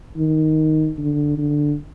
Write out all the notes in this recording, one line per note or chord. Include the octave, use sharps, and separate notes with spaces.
D#3
D3
D3